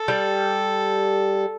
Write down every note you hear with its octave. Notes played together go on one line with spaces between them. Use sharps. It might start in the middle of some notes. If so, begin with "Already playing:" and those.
Already playing: A4
G3